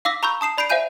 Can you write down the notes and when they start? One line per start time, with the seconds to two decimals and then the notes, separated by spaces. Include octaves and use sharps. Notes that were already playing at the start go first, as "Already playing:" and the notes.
0.05 F5 D6 E6 A#6 B6
0.23 A#5 B5 C#6 E6 G6
0.41 A5 D#6 C7 E7
0.58 D5 B5 G6 C7 D7
0.70 C5 E5 F5 G#5 G6 D#7